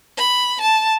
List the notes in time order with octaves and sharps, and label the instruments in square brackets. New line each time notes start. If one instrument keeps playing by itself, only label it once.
[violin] B5
A5